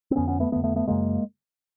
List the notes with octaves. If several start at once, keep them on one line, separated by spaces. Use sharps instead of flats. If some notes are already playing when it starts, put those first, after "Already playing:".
C4
F2 D3 B3 C#4
B3 C#4
A3 B3
F2 D3 A3 B3
A3 B3
A3 B3
F#2 C#3 G#3 A#3